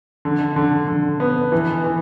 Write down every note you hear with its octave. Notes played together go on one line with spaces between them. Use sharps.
D3
D3
D3
B3
E3
E3